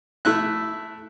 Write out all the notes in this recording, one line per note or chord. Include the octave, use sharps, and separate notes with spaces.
A3 E4 F#6